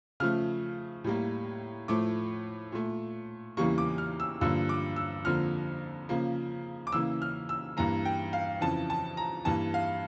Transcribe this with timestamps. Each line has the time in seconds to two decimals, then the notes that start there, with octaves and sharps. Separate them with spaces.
0.20 C#3 F3 A3 F6
1.04 A2 G3 A#3
1.88 A2 F3 A3 D6
2.72 A#2 A3
3.57 E2 C#3 E3 G3 A#3 C#6
3.78 D6
3.98 F6
4.20 E6
4.41 G2 D3 F3 A#3 E6
4.69 D6
4.96 E6
5.25 F2 D3 F3 A#3 F6
6.09 C#3 F3 A#3
6.87 D6
6.92 C#3 E3 A#3 E6
7.22 F6
7.49 E6
7.77 G2 E3 A#3 A#5
8.05 G5
8.33 F5
8.61 F2 C#3 E3 A5
8.90 A5
9.17 A#5
9.45 G2 E3 A#3 A5
9.74 F5